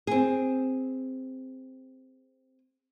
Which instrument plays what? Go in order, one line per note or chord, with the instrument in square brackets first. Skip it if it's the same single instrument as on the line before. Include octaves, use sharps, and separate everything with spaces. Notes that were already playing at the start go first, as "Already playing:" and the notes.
[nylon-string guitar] C4 G#4